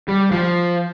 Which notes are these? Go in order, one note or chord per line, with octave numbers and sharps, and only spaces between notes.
G3
F3